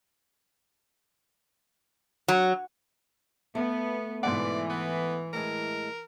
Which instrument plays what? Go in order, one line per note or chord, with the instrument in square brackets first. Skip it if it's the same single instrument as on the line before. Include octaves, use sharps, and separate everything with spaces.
[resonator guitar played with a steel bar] F#3
[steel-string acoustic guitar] A3 [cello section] B3
[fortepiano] G#2 B2 F#5 [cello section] E3 [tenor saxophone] D5
[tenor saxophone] B3
[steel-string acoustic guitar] A2 G#3 [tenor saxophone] A#4